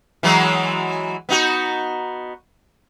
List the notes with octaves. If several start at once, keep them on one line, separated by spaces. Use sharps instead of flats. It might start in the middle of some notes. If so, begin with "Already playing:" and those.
E3 F#3 G#3
B3 D#4 F#4